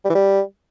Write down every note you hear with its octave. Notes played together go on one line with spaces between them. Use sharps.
G3
E3
G3